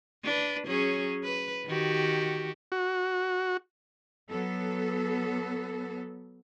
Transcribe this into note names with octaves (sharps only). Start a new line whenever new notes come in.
D4 B4
F#3 C#4 G#4
B4
D#3 F#4 G4
F#4
F#3 B3 A4